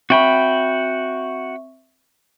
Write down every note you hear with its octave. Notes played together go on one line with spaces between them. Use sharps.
C4 F#4 E5 G5 B5 C#6